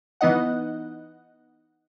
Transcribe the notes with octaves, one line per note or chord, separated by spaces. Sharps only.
E3 B3 D#4 D#5 F#5